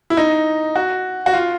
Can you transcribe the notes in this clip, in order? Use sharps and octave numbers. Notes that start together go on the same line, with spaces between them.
E4
D#4
F#4
F#4
F4